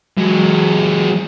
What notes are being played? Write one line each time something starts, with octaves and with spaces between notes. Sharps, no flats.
F#3 G#3